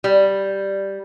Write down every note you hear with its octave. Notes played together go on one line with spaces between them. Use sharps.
G3